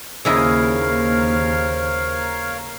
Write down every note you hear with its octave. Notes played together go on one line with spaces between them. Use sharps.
D#2 C#3 E4 A#4 C5 C#5 D#5 F5